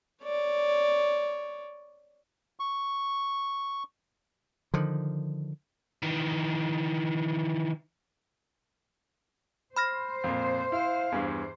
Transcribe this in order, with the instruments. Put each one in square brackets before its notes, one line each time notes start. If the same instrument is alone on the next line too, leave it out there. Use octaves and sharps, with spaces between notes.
[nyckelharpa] C#5 D5
[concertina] C#6
[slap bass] D3 D#3 F3
[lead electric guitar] D#3 E3
[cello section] C5 [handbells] B5 F6 A#6
[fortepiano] F2 A#2
[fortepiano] E4 [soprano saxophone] F5
[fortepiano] E2 G2